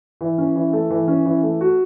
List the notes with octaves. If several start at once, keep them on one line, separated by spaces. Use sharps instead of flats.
E3
C#4
E3
A3
E3
C#4
E3
A3
F#4